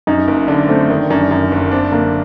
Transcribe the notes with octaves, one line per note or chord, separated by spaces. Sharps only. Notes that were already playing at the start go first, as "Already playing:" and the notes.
F#2 D#4
F#1
D3 D4
A3 C4
D#3 D4
F#2 D4
F#2
F#1
C4 D4
D3 A#3